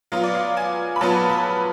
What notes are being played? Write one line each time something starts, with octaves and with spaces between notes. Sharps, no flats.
F#3 B3 F4 F5
D5
F5
G#5
B5
F#3 B3 F4 A5
B5